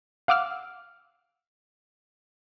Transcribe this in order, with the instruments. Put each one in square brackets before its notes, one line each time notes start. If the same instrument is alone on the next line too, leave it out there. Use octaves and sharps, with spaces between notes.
[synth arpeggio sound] F5 F#5 D6 E6 F6